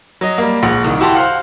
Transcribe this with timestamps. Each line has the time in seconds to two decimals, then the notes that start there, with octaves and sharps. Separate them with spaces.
0.21 F#3 D#5
0.38 G3 A#3
0.63 A#1 G#3 F#5
0.84 C2 D#3
1.00 E4 F#4 G4 E5 A5 C6
1.15 C5 F5 F#5